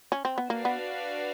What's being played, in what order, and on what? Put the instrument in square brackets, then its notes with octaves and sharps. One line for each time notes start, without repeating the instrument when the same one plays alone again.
[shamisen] C#4
C4
B3
[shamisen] A#3 [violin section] D4 F#4 B4 D5 F5
[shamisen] B3